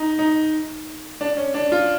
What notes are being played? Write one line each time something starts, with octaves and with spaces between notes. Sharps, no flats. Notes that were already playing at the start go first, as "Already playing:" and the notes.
Already playing: D#4
D#4
D4
C#4
D4
F4